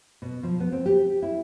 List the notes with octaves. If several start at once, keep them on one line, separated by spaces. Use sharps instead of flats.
B2
F3
B3
C4
G4
E4